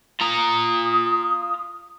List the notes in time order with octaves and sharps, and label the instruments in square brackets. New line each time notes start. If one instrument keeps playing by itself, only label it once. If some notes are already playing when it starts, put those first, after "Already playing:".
[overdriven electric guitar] F4 A#5 [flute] D#6